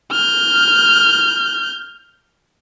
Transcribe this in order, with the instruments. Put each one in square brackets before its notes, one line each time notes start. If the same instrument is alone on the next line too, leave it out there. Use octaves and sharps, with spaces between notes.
[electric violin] F6 G6